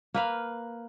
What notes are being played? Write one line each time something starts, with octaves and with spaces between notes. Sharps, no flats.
A#3 B4 F5